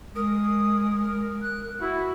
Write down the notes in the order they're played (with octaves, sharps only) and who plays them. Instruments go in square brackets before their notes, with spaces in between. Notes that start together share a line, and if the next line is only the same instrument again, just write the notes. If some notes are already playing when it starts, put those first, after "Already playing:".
[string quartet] G#3 [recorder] A#4 [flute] D#6
[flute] F#6
[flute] E4 [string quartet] F#4